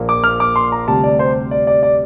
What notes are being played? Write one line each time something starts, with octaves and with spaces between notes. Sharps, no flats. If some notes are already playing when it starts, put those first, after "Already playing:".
Already playing: A#1 A#2 F3 A#3
D6
F6
D6
C6
A#5
D2 C3 G3 A5
D5
C5
D5
D5
D5